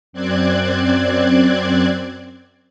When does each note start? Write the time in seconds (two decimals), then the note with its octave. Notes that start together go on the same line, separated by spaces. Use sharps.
0.13 F#2 C4 D5 F#6 G#6